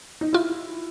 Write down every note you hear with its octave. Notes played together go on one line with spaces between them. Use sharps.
D#4
E4 F4